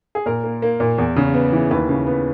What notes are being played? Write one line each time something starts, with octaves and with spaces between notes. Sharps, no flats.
G#4
A#2 A#4
A#3
A#3
A#2
E2
C#3
B3
E3
D#2 B4
C#3
B3